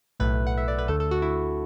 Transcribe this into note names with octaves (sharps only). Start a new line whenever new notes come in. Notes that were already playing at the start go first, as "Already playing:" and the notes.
B1 A2 A3 B4
F#5
E5
D5
B4
D2 D3 A3 A4
A4
F#4
E4